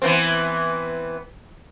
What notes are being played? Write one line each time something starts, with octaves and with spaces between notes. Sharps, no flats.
E3 B3 C4